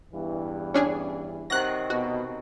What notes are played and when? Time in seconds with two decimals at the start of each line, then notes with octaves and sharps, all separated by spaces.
0.12 E2 G2 E3
0.74 C#4 D4 G#4
1.50 C3 D#3 F#3 F#6 A#6
1.90 B2 F#4